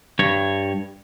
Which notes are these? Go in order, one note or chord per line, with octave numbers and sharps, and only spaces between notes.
G2 C#5